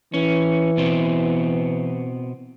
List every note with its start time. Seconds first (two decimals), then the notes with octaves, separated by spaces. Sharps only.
0.14 E3 C#4
0.77 B2 B3 C4